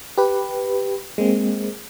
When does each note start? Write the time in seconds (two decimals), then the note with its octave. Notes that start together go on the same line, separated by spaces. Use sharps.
0.18 G4 B4
1.18 G#3 A#3 C4